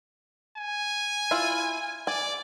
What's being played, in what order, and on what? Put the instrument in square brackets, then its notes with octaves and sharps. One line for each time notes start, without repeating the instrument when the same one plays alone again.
[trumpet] G#5
[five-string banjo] E4 F4
[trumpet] D5 [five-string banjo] G#5